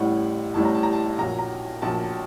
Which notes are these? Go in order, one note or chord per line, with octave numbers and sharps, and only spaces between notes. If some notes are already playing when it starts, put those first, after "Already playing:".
Already playing: A1 A2 G3 F#5
A1 A2 G3 A5
A#5
A5
A#5
A5
A#1 A#2 F#3 A#5
A#5
A#1 A#2 F#3 A5